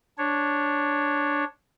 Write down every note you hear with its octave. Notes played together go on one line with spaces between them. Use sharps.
D4 C#5